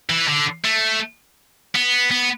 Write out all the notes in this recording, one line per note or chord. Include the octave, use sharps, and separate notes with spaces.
E3
D3
A3
B3
B3